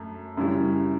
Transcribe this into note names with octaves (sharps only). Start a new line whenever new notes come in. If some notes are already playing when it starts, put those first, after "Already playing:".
Already playing: F#2 A3
F#2 C#3 G3 C#4 E4